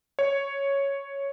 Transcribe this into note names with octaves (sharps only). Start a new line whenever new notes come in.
C#5